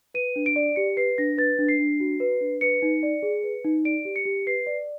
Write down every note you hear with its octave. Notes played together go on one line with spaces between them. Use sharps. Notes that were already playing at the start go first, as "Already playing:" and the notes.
B4 D#7
D4
D7
D5
G4 C#7
B4 C7
D4 A#6
B4 A6
D4
C7
D4
F#4
B4
D4
B4 C#7
D#4
D5
G#4
B4
D#4
D5 D7
G4
C#7
G4
B4 C7
D5